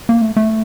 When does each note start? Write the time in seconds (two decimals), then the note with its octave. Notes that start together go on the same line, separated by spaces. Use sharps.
0.09 A#3
0.22 A3
0.37 A3